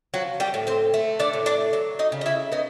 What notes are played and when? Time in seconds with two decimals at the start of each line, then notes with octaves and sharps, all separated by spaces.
0.14 F3 F#3 F#4
0.40 G3 G4
0.54 A2
0.67 C4 C5
0.94 A3
1.20 D4 D5
1.33 A2
1.46 D4 D5
1.73 F#3
1.99 D#4 D#5
2.12 C#3
2.21 D#5
2.26 E4 E5
2.52 B3 D#4 D#5